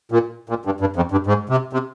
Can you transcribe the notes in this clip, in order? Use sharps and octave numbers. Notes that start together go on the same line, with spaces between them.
A#2
A#2
G2
G2
F2
G2
G#2
C3
C3